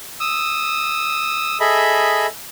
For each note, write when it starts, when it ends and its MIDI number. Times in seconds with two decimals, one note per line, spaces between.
0.20 1.58 87
0.20 1.58 88
1.60 2.26 68
1.60 2.26 69
1.60 2.26 75
1.60 2.26 76
1.60 2.26 83